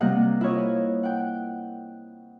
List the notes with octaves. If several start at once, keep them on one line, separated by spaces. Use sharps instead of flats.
C3 G3 A#3 C4 D#5 F#5
E4 F4 C#5 D#5
F#5 G5